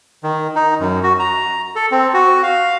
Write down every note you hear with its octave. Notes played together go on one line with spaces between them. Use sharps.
D#3
D#4
F#2
F#4
A#5
A4
C4
F#4
F5